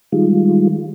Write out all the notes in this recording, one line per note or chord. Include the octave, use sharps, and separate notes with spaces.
D#3 G3 G#3 F4